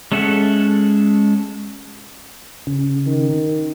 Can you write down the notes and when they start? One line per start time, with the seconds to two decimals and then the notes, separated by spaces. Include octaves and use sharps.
0.12 G#3 C#4 A4 E5 F#5
2.67 C#3
3.07 D#3